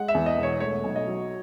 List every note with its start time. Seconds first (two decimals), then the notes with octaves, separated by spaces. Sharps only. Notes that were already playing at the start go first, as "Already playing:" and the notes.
Already playing: G#3 F#5
0.08 E5
0.14 E2
0.26 D#5
0.37 E1
0.43 C#5
0.60 A3 C#5
0.84 B1
0.96 D#5
1.07 F#3